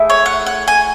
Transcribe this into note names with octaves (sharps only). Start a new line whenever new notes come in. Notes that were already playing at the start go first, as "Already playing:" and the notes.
Already playing: A3 E4 G#4
C#5
F#5
F#5
G#5